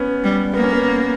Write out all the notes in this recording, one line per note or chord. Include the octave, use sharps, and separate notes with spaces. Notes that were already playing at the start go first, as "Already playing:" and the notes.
Already playing: B3 C#4
G3
A#3 B3
C#4
B3